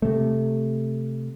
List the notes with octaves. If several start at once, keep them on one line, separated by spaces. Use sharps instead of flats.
C3 A3